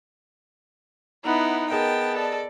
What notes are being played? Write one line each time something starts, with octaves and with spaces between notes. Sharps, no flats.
B3 D#4 E4 F#5
B3 G#4 A#4 D#5 G5 A5
A4 D5